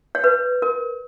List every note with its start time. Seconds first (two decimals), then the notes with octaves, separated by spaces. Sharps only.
0.15 C#5
0.24 B4
0.62 A#4